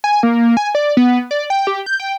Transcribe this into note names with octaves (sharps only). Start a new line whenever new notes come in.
G#5
A#3
G#5
D5
B3
D5
G5
G4
G6
G5